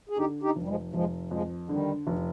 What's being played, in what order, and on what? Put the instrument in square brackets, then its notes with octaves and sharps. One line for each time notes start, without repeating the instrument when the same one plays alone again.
[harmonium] G#4
[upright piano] D3 [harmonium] D#4 G4
[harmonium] D#4 G4
[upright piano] F1
[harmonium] G3
F3 G#3
[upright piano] F1 [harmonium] F3 G#3
[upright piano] F2 [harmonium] F3 G#3
[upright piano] D3 [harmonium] D#3 G3
[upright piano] F1